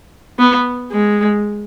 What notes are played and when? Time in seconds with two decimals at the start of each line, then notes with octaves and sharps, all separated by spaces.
0.39 B3
0.92 G#3